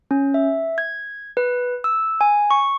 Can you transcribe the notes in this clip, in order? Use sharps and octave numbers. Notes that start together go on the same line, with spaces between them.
C#4
E5
G#6
B4
E6
G#5
C#6